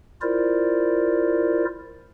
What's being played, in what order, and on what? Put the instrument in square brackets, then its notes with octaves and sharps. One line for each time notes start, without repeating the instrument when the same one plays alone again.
[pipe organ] E4 F4 A#4 C5 D5